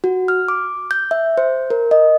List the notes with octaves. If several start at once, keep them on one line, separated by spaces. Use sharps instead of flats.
F#4
F6
D6
G6
E5
C5
A#4
D#5